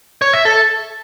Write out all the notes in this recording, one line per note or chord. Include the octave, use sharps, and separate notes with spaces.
C#5
E5
A4